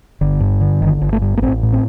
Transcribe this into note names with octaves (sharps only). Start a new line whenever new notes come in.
G1 D3
G2
D3
G1 D#3
G1
A3
G2
A#3
A1 C4
A2
C4